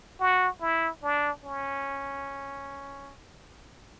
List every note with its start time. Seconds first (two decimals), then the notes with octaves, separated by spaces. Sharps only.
0.20 F#4
0.61 E4
1.03 D4
1.44 C#4